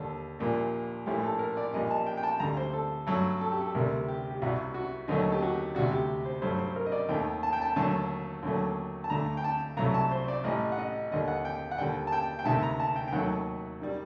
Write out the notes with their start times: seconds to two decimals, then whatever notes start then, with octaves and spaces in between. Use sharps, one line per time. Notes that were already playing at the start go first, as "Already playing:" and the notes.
Already playing: D#2 D3 G3 A4
0.39 A#1 A#2 G3
1.06 A#1 A2 A3 G4
1.23 A4
1.39 A#4
1.57 D5
1.73 A#1 A#2 G3 D#5
1.91 A5
2.06 G5
2.17 G5
2.23 A5
2.40 D2 D3 G3 A#5
2.57 C5
2.73 A4
3.07 G2 F#3 A3 A4
3.41 A4
3.52 G4
3.61 A4
3.75 D2 C3 G3 A#4
4.08 G4
4.31 G4
4.42 C2 C3 G3 F#4
4.74 F#4
5.08 D#2 D3 F#3 A3 D#4
5.32 G4
5.42 F#4
5.75 D2 C3 G3 F#4
5.91 G4
6.26 C5
6.42 G2 F#3 A3 C5
6.59 C5
6.76 A#4
6.86 D#5
6.92 D5
7.09 D#2 D#3 A3 G5
7.43 A5
7.53 G5
7.62 A5
7.76 D#2 D3 F#3 A3 A5
8.43 D#2 D3 F#3 A3
9.04 A5
9.10 D2 D3 A3 A#5
9.37 G5
9.44 A5
9.77 C2 C3 F#3 A3 A#5
9.94 A5
10.11 C5
10.28 D5
10.44 A1 A2 G3 D#5
10.72 F#5
10.78 D#5
11.11 D#2 D3 G3 D#5
11.28 F#5
11.45 G5
11.71 F#5
11.78 D#2 D3 G3 G5
12.07 A5
12.12 G5
12.39 G5
12.45 D2 C3 D#3 A3 A5
12.63 A#5
12.80 A5
12.96 G5
13.08 G5
13.12 D#2 D#3 F#3 A3 F#5
13.82 D#3 G3